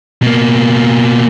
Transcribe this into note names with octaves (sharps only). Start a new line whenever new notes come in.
B2 A#3